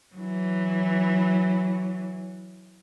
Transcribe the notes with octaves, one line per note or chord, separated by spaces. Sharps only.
E3 F#3